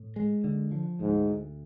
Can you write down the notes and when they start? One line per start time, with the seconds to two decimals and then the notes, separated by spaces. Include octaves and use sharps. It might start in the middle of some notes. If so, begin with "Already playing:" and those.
Already playing: A2
0.16 G#3
0.44 D3
0.71 F3
1.00 D2 G#2
1.28 D2